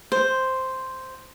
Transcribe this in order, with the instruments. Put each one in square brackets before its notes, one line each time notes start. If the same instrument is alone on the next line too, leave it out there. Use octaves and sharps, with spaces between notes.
[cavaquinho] C5